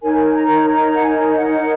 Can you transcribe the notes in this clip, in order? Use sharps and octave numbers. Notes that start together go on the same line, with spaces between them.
D#4 A#4 C#5 G#5
A#5
A#5
F#5
G#5
F#5